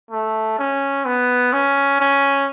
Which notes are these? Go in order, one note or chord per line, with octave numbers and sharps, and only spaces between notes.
A3
C#4
B3
C#4
C#4